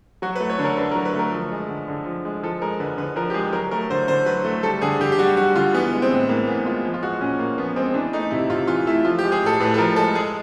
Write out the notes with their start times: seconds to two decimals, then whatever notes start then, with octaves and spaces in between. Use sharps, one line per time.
0.22 F#3 F#4
0.36 B4
0.40 A3
0.50 C#5
0.59 D3
0.64 A#4
0.77 D3 B4
0.91 A#4
0.96 F#3
1.05 B4
1.14 A3
1.19 A#4
1.32 F3
1.52 G#3
1.69 D3
1.88 D3
2.06 F3
2.25 G#3
2.43 F3 A4
2.62 G#3 A#4
2.80 D3 B4
2.98 D3 B4
3.16 F3 A#4
3.30 G4
3.34 G#3 G#4
3.53 F#3 A#4
3.71 A3 A#4
3.90 D3 C5
4.08 D3 C5
4.26 F#3 B4
4.45 A3
4.63 G3 A4
4.82 D3 G#4
5.00 D3 G4
5.12 G4
5.18 G3 F#4
5.37 G3 F#4
5.55 D3 F4
5.74 E3 B3
5.93 G#3
6.02 C4
6.10 A2
6.28 A2 A#3
6.47 E3 B3
6.65 G#3 F4
6.85 F3
6.94 F4
7.03 G#3 F#4
7.21 A#2 C#4
7.39 A#2 A#3
7.58 F3 B3
7.76 G#3 C4
7.94 E3 D4
8.13 A3 D#4
8.31 C3 E4
8.50 C3 F4
8.67 E3 F4
8.86 A3 E4
9.05 F3 F4
9.19 G4
9.24 G#3
9.32 G#4
9.42 A2 A4
9.60 A2 B4
9.74 A4
9.78 F3 A#4
9.96 G#3 A4
10.15 G#3 G#4